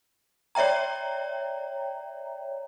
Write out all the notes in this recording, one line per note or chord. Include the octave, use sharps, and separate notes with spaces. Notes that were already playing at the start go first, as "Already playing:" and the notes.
C#5 D5 E5 G5 A#5